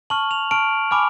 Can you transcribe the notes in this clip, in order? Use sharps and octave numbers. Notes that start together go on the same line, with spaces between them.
A5 C#6 F6 F#7
F7
A5 C#6 F6 D7
G#5 B5 D6 F6